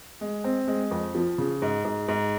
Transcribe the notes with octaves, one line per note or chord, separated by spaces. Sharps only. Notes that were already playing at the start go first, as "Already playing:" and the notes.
G#3
C4
G#3
F2
F3
C#3
G#2
G#2
G#2